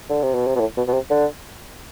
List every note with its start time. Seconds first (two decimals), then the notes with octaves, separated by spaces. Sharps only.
0.10 D3
0.23 C3
0.34 B2
0.47 C3
0.56 B2
0.60 A2
0.77 B2
0.88 B2
0.94 C3
1.10 D3